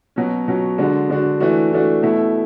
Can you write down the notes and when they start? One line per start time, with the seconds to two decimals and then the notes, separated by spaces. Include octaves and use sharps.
0.16 B2 F#3 C#4
0.48 B2 F#3 C#4
0.78 D3 G#3 D4 F#4
1.10 D3 G#3 D4 F#4
1.40 E3 A3 D4 F#4
1.71 E3 A3 D4 F#4
2.03 B2 A3 E4